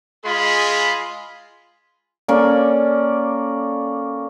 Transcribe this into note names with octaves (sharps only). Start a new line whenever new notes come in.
G#3 F4 G#4 B5 C6
A#3 C#4 A4 D5